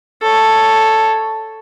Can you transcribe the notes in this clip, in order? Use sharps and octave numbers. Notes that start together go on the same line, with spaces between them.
A4 C#5